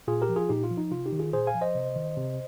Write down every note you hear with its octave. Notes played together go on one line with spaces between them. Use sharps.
A#2 F4 G#4
G4 A#4
F3
F4 G#4
A#2 D#4 G4
F4
F3
D#4
C3 F4
D#4 G4
D#3
F4 G#4
A#2 G#4 C5
F5 G#5
F3
C5 D#5
C3
D#3
C3